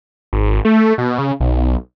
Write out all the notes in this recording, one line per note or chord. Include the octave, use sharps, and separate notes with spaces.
G#1
A3
B2
C#3
B1